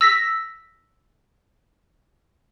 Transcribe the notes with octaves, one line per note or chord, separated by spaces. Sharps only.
E6 A#6 B6